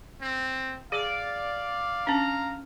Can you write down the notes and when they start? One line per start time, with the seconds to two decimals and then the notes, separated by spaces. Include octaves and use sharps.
0.22 C4
0.92 G#4 D5 F5
2.07 C#4 D4 A#5